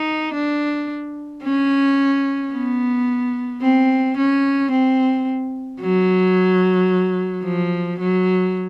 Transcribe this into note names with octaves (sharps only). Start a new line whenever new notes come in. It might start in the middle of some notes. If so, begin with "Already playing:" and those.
Already playing: D#4
D4
C#4
B3
C4
C#4
C4
F#3
F3
F#3